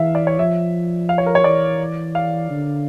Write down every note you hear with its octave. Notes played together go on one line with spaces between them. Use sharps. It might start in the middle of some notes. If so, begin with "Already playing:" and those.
Already playing: E3 E5 F5
D5
C#5
F3 E5
F5
C#5
A#4
C#5
E3 D5
F5
D3